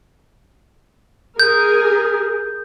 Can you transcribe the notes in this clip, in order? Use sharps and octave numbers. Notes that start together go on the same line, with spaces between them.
G#4 A#4 G6